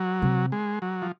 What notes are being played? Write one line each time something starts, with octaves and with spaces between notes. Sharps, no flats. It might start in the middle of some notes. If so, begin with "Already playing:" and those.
Already playing: F#3
C3
G#3
F#3
F3